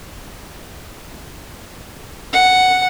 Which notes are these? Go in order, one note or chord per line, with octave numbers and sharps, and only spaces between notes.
F#5